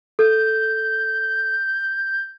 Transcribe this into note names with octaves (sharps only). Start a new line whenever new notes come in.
A4 G6